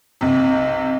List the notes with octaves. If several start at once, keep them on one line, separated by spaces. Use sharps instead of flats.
B1 C3